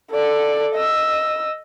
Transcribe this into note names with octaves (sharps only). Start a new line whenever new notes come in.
A4 D5
D#5 E6